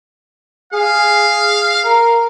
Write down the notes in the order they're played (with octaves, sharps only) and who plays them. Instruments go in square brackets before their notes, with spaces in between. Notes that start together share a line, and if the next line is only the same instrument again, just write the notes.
[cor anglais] G#4 [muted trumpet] F5
[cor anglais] A#4